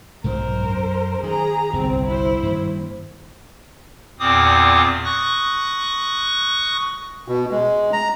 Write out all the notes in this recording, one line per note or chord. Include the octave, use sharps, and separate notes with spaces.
B1 G#2 F#3 A#4 C5
F#2
D#3 G#4 A#5
G1 C2 C4
E4 C5
G2 D#3 A#3
E2 A#2 C4 D6 D#6
C#6 D#6 F#6 A#6
B2
G#3
A#5